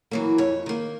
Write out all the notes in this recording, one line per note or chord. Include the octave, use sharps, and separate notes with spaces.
E3 F#3 A#3
F2 C#5
D#3 A#3